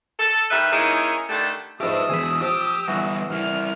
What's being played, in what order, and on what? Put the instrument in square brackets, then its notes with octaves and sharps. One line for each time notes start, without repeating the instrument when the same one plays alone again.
[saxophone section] A4
D#3 G3 A4 B4 E5
D#3 A#3 C#4 D#4 E4 G#4
D3 D#3 G3 A3
[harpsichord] G#2 F3 A3 [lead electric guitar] G4 B4 [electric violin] D#6 E6
[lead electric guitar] E2 B2 [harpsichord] G#4 B5
[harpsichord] F3 [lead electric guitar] G4
[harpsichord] E3 F#4 [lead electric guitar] G3 B3
[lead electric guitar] G3 E4 [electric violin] F6